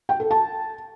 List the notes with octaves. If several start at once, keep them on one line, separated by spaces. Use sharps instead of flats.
G5
A4
A5